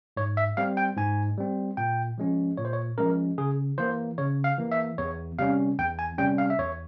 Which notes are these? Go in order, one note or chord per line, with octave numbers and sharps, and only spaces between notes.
G#2 C#5
E5
G3 C4 F5
G5
G#2 G#5
G3 C4
A#2 G5
F3 G#3 C#4
A#2 C#5
C5
C#5
F3 G#3 C#4 A#4
C#3 G#4
E3 A#3 C5
C#3 C#5
F5
E3 A#3
E5
E2 C#5
C3 G3 C#4 F5
E2 G5
G#5
C3 G3 C#4 G5
F5
E5
E2 C#5